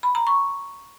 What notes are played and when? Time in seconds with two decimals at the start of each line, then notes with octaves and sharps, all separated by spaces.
0.03 B5
0.15 A#5
0.27 C#6